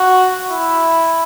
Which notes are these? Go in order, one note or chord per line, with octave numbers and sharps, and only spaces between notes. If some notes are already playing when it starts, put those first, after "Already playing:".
Already playing: F#4
E4